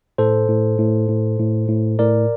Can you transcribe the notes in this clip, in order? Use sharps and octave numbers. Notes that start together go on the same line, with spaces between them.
A2 A4 C5
A2
A2
A2
A2
A2
A2 A#4 D5